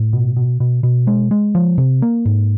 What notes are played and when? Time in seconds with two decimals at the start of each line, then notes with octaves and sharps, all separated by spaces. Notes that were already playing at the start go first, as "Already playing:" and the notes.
Already playing: A2
0.13 B2
0.36 B2
0.60 B2
0.83 B2
1.07 G#3
1.31 G#3
1.55 F3
1.78 C3
2.02 A#3
2.26 G#2